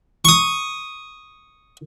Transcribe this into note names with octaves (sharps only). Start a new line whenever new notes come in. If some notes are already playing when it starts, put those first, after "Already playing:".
C#6 D#6